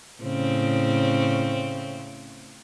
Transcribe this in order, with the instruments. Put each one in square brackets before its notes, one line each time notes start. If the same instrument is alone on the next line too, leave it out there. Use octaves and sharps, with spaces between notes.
[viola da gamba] A2 C#3 C4